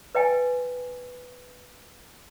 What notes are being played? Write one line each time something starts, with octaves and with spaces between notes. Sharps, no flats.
B4 D#5 G5 G#5